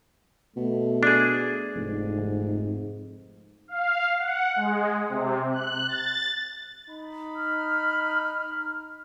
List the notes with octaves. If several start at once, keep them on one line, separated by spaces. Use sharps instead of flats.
B2 A3
D4 G#4
F1 G#2
F5
F#5
G#3
C3
F#6
A6
D#4 B5
F6